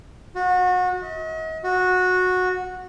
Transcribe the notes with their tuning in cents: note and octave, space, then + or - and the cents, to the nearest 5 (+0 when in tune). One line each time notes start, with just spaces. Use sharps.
F#4 -30
D#5 +40
F#4 -15